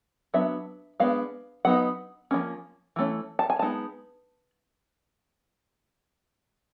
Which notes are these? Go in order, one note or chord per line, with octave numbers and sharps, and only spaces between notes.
F#3 B3 D4 E5
G#3 B3 D4 F5
F#3 B3 D#4 F#5
F3 A#3 C#4
E3 A3 C#4
A5
G#5
G#3 B3 D#4 A5